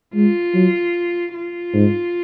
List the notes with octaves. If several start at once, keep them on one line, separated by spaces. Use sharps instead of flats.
G#3 F4
F#3
F4
G#2